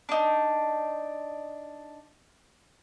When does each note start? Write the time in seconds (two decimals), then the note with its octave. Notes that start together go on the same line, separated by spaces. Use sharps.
0.09 D4 D#4